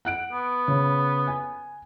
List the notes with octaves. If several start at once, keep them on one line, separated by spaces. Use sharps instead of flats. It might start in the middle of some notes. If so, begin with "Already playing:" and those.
F#5 F#6 D7
B3
C#3
G#5